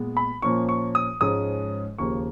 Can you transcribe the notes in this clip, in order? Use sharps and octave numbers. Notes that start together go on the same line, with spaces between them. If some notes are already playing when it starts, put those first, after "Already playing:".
Already playing: A#2 G#3 B3
B5
A#2 F3 A#3 C#4 C#6
C#6
D#6
G#2 F3 G#3 C#4 D#6
D#2 C#3 F3 A#3 C#6